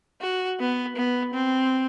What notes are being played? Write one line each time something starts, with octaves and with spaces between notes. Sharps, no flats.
F#4
B3
B3
C4